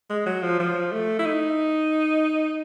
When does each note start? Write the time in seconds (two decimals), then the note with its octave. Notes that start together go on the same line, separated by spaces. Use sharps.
0.09 G#3
0.26 F#3
0.43 F3
0.60 F3
0.92 A3
1.19 E4
1.26 D#4